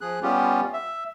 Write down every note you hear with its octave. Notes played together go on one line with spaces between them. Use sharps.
F3 G#4 F#6
G3 B3 C#4 F4 G4
E5